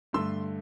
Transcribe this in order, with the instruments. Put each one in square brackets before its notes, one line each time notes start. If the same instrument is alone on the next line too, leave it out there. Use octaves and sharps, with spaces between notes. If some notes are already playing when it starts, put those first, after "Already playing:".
[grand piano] G2 D3 A3 C6 E6